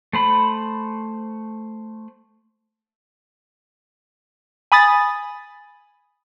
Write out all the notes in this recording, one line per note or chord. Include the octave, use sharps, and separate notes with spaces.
A3 C5 B5
G#5 B5 D#6 A6